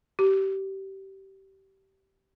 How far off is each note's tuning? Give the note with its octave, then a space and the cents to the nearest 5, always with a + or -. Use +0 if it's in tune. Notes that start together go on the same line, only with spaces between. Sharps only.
G4 -25